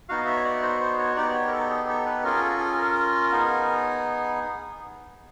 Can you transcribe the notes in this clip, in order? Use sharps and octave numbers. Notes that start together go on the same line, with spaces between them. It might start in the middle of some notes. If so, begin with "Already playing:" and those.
B3 D#4 F#4 F5
D#5
E5
C#5
D5
C5
C5
C#5
B3 D#4 G4 D5
D5
C#5
A#4
A4
G#4
A4
B4
C#4 F4 G#4 A#4
A4
G#4
A#4
B3 D#4 G#4